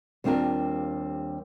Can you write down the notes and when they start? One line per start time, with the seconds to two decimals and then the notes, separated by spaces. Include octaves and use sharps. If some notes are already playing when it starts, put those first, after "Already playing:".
0.24 D#2 G3 C4 D4 F4 A#4